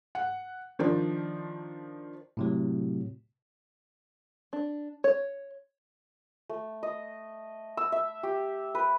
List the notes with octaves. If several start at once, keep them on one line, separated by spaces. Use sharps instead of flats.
F#5
D#3 F3 D4
A2 C3 F#3
D4
C#5
A3
D#5
E6
E5
G4
B4